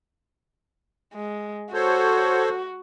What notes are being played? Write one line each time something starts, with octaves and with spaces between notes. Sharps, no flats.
G#3
F#4 A4 C5 C#5